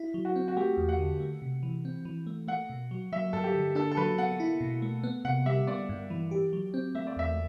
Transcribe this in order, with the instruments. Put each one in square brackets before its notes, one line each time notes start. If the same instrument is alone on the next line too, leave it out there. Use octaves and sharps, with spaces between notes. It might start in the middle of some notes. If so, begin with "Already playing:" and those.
Already playing: [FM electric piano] E4
F#3
[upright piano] F#4
[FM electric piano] C4
[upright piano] F#4
[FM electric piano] A3 [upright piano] G4
[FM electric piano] E2
[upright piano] F#5
[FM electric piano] D3
A3
C3
E3
C4
E3
A3
[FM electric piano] A3 [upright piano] F#5
[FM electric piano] B2
F#3
[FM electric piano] F#3 [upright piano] E5
[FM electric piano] G2 [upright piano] A4
[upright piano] G4
[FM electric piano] D3
[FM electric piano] D4 [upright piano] A4
[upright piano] A4
[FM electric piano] F#3 [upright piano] B4
[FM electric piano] B3 [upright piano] F#5
[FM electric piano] E4
B2
A3
B3
[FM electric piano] C3 [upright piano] F#5
[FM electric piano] G3 [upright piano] E5
[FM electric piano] B3 [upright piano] D5
[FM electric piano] G2
E3
G4
F#3
C4
[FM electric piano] A3 [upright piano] E5
[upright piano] D5
[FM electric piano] E2 [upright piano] E5